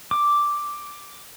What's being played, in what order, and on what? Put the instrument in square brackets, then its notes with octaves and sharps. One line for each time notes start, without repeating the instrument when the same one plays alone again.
[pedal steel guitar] D6